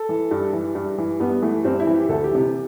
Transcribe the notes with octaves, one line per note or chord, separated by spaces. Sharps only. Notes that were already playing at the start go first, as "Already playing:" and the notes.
Already playing: A4
E3
G2
E3
G2
E3
G2 B3
E3 A3
G2 C4
E4
E3
G4
D2 A4
G4
C3 E3